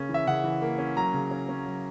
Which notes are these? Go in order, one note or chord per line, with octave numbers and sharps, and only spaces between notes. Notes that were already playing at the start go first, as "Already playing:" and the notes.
Already playing: C#3 A#3 C#4
E3
E5
C#3 F#5
E3
A#3
C#4
F#3 A#5
C#3
C#4
C#4
F#3